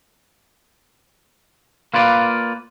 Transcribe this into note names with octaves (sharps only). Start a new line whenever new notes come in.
A#3 F4 B4 D5